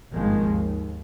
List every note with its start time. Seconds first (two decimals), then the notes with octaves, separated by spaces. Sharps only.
0.11 G#1 G2 D#3 F3 G#3 A#3
0.44 D#2